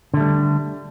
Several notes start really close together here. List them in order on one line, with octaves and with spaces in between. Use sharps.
D3 A3 G3